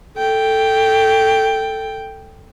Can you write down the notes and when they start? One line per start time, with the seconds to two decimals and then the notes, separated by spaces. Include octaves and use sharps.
0.18 A4 G5